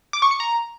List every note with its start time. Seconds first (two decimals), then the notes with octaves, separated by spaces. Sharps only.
0.13 D6
0.22 C#6
0.31 C#7
0.40 A#5